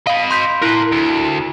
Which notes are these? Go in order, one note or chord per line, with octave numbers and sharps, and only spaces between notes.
D#5 F5 B5
C6 G6 B6
E4 A#4 C6
D2